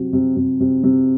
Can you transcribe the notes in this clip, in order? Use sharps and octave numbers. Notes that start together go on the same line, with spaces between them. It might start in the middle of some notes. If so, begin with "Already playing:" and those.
Already playing: C3 F#3
C3
C3
C3
C3